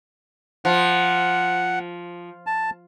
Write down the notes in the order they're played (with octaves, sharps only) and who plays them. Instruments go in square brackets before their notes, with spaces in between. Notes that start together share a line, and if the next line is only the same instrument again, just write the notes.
[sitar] F3 [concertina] F#5
[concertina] A5